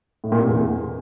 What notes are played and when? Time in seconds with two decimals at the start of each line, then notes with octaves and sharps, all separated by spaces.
0.24 A2
0.32 A#2
0.40 C3
0.49 E2